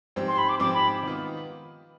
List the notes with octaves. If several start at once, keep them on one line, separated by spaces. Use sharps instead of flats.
G#2 F3 C4 G4 C5
C6
B5
D6
G#2 F3 C4 G4 C5 D6
B5
D#3 B3 F4